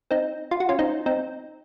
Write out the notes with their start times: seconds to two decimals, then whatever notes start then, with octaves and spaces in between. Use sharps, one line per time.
0.11 C4 D#4
0.51 F4
0.60 F#4
0.69 C#4 F4
0.79 C4 D#4
1.06 C4 D#4